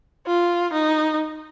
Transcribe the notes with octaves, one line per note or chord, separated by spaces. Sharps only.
F4
D#4